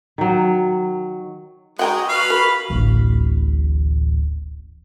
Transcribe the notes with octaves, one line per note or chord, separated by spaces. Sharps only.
D#3 F#3
G#3 F#4 F#5 G5 A#5
B4 F5 C7
A#4 B5
D1 A1